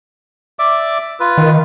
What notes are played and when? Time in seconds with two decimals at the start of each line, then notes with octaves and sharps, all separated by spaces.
0.59 D5 E5 D6
1.20 F4 B4
1.37 D#3